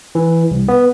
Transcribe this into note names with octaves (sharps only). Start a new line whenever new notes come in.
E3
C2
B3